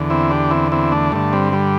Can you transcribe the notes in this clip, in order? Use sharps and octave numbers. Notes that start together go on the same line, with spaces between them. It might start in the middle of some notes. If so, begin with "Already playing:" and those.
Already playing: E2 D3
C4 E4
D4 G4
C4 E4
C4 E4
A3 D4
G2 D3 A3
G3 C4
G3